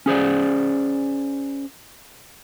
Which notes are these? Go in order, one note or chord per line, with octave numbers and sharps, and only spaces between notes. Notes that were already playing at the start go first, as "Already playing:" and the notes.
C#4 G#4 C5 D5